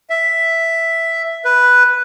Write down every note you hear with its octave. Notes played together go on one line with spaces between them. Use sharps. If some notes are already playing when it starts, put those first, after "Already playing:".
E5
B4